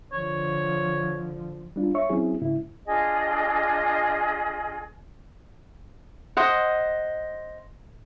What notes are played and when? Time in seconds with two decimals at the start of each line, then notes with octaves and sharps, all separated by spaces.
0.13 D3 F3 C#5
1.76 G3 D4 F4
1.95 C#5 E5 C#6
2.10 F#3 C4 C#4 E4 G#4
2.42 G#2 C#3 E4
2.86 D4 F4 G#4 D#5
6.37 C5 D#5 F#5